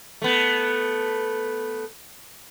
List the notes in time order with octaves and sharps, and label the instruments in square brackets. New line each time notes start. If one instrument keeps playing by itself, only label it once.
[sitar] A3 B3